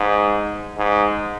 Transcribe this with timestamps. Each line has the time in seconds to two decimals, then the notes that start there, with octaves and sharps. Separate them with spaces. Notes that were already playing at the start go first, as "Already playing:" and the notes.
Already playing: G#2
0.78 G#2